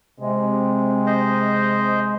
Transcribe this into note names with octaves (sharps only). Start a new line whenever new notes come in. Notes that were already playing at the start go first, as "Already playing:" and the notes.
C3 G#3
C5 D#5